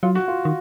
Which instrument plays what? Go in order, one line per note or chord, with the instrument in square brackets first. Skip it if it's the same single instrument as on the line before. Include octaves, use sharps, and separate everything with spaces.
[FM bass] F#3 [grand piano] F4
[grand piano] F#4
F4
[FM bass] D#3